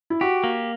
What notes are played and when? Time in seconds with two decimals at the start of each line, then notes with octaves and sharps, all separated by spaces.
0.10 E4
0.21 F#4 G4
0.44 A#3